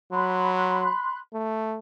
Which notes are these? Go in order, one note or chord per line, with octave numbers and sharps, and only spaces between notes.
F#3 B5 C6 F#6
A3